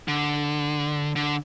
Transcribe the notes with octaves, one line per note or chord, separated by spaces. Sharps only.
D3
D3